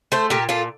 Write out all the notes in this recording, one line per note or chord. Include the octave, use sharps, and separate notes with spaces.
A3 A4 C5
A#2 G4 A#4
A#2 F4 A4